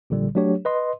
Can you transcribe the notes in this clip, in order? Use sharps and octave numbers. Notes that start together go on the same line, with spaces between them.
A#1 A#2 D3 G3
F#3 A3 D4 G4 C#5
B4 D#5 C6